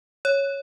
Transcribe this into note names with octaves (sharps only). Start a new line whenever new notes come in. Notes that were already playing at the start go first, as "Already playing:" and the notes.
C#5